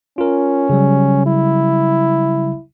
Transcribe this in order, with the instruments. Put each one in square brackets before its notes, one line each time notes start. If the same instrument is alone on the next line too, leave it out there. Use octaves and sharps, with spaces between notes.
[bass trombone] C#4 [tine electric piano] F4 A#4
[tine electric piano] C#3 F#3 G3
[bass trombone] E4